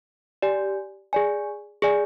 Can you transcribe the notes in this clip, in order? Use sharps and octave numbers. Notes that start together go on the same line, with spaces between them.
G4 D5 G#5
G#4 D5 G#5
G#4 D5 G#5